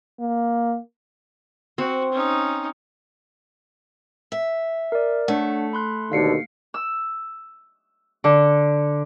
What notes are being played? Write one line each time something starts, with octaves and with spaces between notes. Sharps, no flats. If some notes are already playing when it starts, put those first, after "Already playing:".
A#3
C4 F#4
C#4 D#4
E5
A#4 D5
A3 D4 C#5 F#5
B5 C6 F#6
D#2 B2 D3 F5 C7 C#7
E6
D3